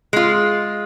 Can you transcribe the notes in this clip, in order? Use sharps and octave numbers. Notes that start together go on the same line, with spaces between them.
G#3 F4